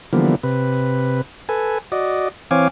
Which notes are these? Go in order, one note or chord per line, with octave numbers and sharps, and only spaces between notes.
D3 E3 F3 G3 A#3 B3
C3 B4
A4 B4 G#5
F#4 D5 D#5
E3 C4 C#5 F5 G#5 D6